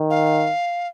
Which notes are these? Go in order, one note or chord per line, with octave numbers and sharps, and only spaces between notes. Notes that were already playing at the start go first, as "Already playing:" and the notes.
Already playing: D#3
F5